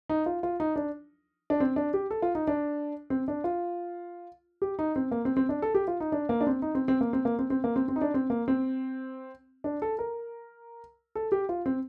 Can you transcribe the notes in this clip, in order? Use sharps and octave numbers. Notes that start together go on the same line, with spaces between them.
D#4
F4
F4
D#4
D4
D4
C4
D4
G4
A4
F4
D#4
D4
C4
D4
F4
G4
D#4
C4
A#3
C4
C4
D4
A4
G4
F4
D#4
D4
A#3
D4
C4
D#4
C4
C4
A#3
C4
A#3
C4
C4
A#3
C4
C4
D#4
D4
C4
A#3
C4
D4
A4
A#4
A4
G4
F4
C4